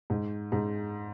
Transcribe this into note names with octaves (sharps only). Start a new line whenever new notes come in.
G#2
G#2